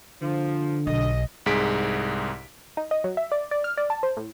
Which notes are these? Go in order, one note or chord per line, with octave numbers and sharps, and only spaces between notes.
D3 F3
B1 D#5
C2 G#2 G#4 B6 D7
D#4
D#5
F#3
E5
D5
D5
F6
D5
A5
C5
A2